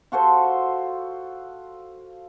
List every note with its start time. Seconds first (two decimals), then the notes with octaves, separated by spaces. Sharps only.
0.12 F4 F#4 A4 C5